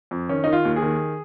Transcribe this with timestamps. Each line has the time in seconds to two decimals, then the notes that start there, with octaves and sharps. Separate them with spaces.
0.11 F2
0.29 D#3 C#4
0.44 D#3 D#4
0.53 F4
0.65 D#2
0.76 G#4
0.82 D#3